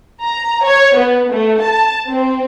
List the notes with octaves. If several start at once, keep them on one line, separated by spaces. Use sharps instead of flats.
A#5
C#5
B3
A3
A5
C4